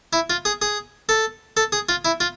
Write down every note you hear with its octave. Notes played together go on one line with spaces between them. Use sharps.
E4
F4
G#4
G#4
A4
A4
G#4
F4
E4
F4